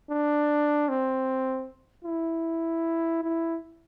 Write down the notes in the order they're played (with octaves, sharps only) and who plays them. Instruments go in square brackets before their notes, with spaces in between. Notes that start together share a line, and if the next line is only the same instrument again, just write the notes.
[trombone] D4
C4
E4
E4